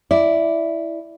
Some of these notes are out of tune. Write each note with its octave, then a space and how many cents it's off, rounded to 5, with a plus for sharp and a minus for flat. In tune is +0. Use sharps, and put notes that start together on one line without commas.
E4 +0 D5 +0